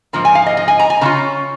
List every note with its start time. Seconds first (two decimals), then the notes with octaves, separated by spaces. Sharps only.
0.13 G#2 F3 A#3 A#5
0.25 G#5
0.35 F5
0.46 D#5
0.57 D#5
0.68 G#5
0.79 A#5
0.90 G#5
1.01 C#3 A#3 C#4 F4 A#5